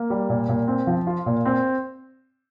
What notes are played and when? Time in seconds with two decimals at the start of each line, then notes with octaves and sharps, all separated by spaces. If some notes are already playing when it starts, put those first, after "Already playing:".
Already playing: A#3
0.10 G3
0.29 A#2
0.49 A#2
0.67 C4
0.87 F3
1.07 F4
1.26 A#2
1.45 C4